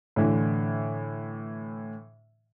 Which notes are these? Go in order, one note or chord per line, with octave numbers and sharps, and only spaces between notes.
A2 D3 E3